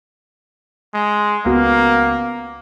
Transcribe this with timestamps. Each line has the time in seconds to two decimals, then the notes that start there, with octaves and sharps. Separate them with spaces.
0.94 G#3
1.45 C#2 A#3 B3 F#4